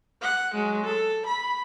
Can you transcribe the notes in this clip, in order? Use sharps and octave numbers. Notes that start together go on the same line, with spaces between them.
F#5
F#3 G#3
A4
B5